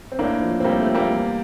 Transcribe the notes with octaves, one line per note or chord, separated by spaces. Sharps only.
C4
A2 A#3 D4
F3
C4
A2 G3 A#3
A3
F3 C4
G3 A#3
E2